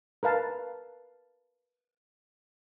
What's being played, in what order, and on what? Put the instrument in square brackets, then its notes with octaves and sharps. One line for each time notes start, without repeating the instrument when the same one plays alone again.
[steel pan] A#4 B4 F5 A5